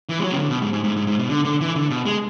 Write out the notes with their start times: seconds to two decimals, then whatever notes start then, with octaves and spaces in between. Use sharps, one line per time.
0.09 E3
0.19 G#3
0.23 F#3
0.32 C#3
0.39 D3
0.50 B2
0.62 G#2
0.73 G#2
0.84 G#2
0.96 G#2
1.07 G#2
1.19 B2
1.29 D3
1.45 D3
1.61 E3
1.76 D3
1.90 B2
2.06 G#3